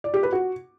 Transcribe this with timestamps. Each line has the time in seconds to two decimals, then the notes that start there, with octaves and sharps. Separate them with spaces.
0.04 D5
0.14 G4
0.23 B4
0.32 F#4